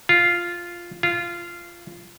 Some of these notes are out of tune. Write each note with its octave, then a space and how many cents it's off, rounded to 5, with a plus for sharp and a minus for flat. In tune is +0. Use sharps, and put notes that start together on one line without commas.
F4 -5
F4 -15